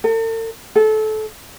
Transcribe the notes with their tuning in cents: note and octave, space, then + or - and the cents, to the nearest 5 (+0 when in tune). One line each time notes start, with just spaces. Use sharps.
A4 +45
A4 -25